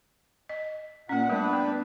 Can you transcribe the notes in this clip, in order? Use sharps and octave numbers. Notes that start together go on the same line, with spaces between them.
D#5
A#2 A#3 C#4 F#5
G3 A3 B3 D4 B4
B3